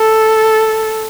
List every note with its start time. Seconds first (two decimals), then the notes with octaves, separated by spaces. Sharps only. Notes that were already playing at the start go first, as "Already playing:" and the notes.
Already playing: A4